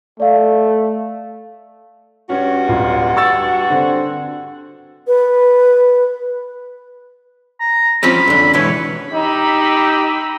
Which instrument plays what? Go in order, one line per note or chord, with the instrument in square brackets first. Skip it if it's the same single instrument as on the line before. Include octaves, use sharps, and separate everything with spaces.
[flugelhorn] A3 [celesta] D5 F5
[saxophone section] G2 F#4 [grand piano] C#4
[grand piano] D1 F4
C#6 E6 A6
D3 C4
[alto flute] B4
[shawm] A#5
[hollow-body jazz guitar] F3 C4 C#4 [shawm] B5
[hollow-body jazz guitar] F#2 D3
[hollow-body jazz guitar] C#2 B2 E3 [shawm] C#5
[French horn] D#4 [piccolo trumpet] G4 [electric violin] B5 E6